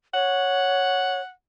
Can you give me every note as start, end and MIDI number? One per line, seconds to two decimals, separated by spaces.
0.14 1.22 73
0.14 1.30 78